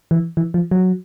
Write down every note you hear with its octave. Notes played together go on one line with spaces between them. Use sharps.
E3
E3
F3
F#3